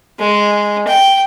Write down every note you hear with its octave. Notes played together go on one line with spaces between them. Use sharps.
G#3
G5